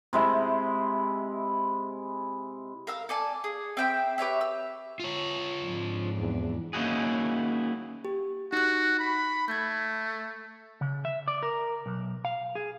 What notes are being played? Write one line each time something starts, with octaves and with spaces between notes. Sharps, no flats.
C3 G#3 E4
A#4 F5 E6
A4 D5 G#5 A5
G#4
C4 E5 G5 B5
G4 B4 C#5 E5
E6
F4 C#5
F2 G#2 D4
E2
A#3 C#4 D#4 E4 F#4 G#4
G4
D#4 F#4 F#6
B5
A3 G6 G#6
C#3
E5
D5
A#4
B1
F5
G#4